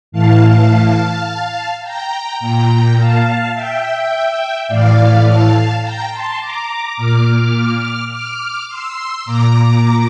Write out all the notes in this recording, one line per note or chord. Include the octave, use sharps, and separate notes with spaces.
A2 E3 F5 A5
G5 A#5
A#2 G5 A#5
F5 A5
E5 G5
A2 E3 D5 F5
F5 A5
G5 A#5
A5 C6
A#5 D6
A#2 D6 F6
D6 F6
C6 E6
A#2 A#5 D6